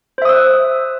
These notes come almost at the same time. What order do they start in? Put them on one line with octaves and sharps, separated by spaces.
C5 E5 D#6 E6 F#6